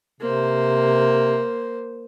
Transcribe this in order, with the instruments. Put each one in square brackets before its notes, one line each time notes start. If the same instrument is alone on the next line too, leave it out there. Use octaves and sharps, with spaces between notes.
[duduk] C3 [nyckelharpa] A#3 C5